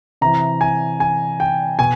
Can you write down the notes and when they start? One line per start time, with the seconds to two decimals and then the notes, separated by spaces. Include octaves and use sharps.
0.21 C3 E3 A#5
0.61 G#5
1.00 G#5
1.40 G5
1.79 B2 G#5